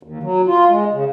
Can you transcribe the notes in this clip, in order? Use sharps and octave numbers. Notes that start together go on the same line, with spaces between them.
D#2
F#3
F4
G#3
C#3